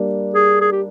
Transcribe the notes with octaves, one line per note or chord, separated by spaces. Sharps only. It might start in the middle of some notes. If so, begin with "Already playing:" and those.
Already playing: G3 A#3 D4
G#4
G#4
G4